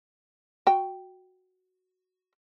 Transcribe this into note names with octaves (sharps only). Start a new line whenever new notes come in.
F#4 G5